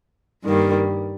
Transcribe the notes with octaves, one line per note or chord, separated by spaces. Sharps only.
G2 D#3 G3 A#3